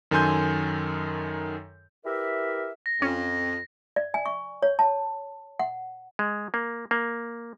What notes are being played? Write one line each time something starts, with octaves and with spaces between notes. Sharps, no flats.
F#2 D#3 A4 G#5 C6 G6
E4 G4 A#4 B4 D5 E5
A#6
F2 C#4
D5
G#5
C#6
C#5
A5
F#5
G#3
A#3
A#3